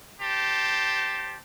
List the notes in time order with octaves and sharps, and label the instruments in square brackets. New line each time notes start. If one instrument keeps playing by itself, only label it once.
[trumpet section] G4 C5 A5